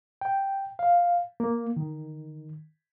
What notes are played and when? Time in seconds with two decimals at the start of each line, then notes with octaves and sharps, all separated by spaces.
0.21 G5
0.79 F5
1.40 A#3
1.76 D#3